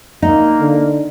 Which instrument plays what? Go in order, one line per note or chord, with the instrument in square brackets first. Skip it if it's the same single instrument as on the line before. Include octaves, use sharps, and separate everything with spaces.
[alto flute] A#3 [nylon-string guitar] D#4
[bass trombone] D3